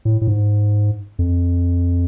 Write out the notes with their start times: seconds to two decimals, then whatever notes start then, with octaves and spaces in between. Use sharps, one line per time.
0.05 A2
0.21 A2
0.27 G#2
1.19 F2